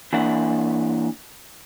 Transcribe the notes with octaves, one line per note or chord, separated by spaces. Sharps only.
E3 A#3 D4 E5 F#5